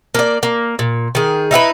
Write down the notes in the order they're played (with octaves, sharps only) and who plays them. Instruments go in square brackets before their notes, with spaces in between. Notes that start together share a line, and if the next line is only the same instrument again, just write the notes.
[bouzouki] A#3 D5
A#3
A#2
D#3 G#4
D#4 E4 G4 B4